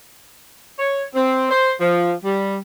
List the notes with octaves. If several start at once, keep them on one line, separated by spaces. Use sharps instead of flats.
C#5
C4
C5
F3
G3